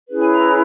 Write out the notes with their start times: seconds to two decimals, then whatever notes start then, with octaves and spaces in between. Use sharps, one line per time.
0.09 C#4 E4 G#4 B4
0.20 G#5
0.31 A#5